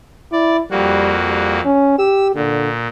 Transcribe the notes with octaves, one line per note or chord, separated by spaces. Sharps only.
E4 D5
F2 G3 A#3 F#4
G3
C#4
G4 E6
A#2 D3